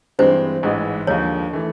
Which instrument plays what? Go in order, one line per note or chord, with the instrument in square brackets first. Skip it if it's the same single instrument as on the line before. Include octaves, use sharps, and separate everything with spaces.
[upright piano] G2 E3 G#3 C4 [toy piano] C5
[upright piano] A1 G#2 E3 G#3
[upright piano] D#2 D3 F3 G#3 [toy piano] C#5
[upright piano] E3 A3